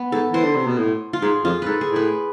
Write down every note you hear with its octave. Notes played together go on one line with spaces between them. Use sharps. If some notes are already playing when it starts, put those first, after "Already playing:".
Already playing: B3
G#2 A4
E3 C5
D3
C3
B2
A2
F4
G#2 G#4
F2 F4
G#2 A4 B4
G#4
A2
B4